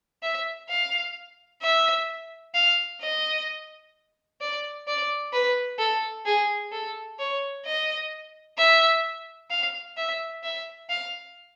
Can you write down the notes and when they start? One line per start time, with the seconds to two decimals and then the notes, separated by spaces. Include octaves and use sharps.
0.23 E5
0.69 F5
1.63 E5
2.55 F5
3.01 D#5
4.41 D5
4.87 D5
5.33 B4
5.79 A4
6.26 G#4
6.72 A4
7.19 C#5
7.65 D#5
8.58 E5
9.51 F5
9.97 E5
10.43 E5
10.90 F5